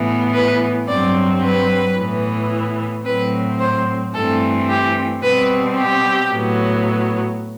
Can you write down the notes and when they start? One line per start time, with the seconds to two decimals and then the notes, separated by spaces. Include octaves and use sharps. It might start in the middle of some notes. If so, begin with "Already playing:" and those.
Already playing: A2 E3 B3
0.33 B4
0.88 G2 F#3 C4 D5
1.43 B4
1.97 A2 E3 B3
3.05 A2 F#3 C4 B4
3.59 C5
4.14 G2 E3 A3 C4 A4
4.69 G4
5.22 B2 G3 C4 B4
5.76 G4
6.31 A2 F#3 B3